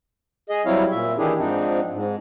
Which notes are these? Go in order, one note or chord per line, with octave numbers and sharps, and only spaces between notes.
G#4 D#5
F#3 G3 C4 E4 C#5 F5
A#2 E5
D#3 E3 D4 E4 G4 G#4
G#2 F3 C4 D4 D#4
G#2